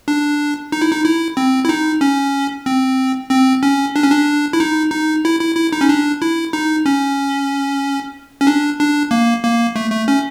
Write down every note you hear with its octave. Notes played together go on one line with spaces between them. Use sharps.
D4
D#4
E4
D#4
E4
C4
E4
D#4
C#4
C4
C4
C#4
D4
C#4
D4
E4
D#4
D#4
E4
E4
E4
D#4
C#4
D4
E4
D#4
C#4
C#4
D4
D4
A#3
A#3
A3
A3
C#4